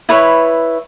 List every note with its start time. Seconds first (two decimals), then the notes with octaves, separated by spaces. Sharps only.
0.09 E4 B4 C#5